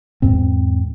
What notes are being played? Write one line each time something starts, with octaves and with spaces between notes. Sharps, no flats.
E2 G#2 C4